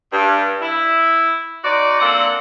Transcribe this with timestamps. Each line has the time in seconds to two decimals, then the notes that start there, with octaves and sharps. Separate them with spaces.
0.12 G2
0.62 E4
1.63 D#4 F#4 C5 D5
2.00 A#3 C4 D4 A4 F#5